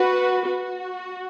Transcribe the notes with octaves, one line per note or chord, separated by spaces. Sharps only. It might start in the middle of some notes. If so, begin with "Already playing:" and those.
Already playing: F#4 B4
F#4